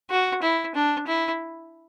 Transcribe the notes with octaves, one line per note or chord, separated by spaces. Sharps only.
F#4
E4
D4
E4